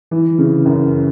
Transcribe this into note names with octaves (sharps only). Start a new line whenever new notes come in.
E3
C#3
F#2